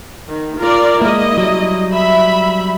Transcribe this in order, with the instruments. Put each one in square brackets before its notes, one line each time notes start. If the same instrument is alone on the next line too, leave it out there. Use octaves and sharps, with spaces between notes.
[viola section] D#3
F4 A#4 D5
[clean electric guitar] G#3 A#3 [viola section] E4 D#5
[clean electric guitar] F#3 G3
[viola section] E5 B5